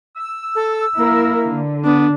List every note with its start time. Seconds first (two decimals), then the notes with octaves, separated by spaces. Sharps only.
0.17 E6
0.55 A4
0.97 A#3 E4 A#4
1.48 D3
1.85 B3 D4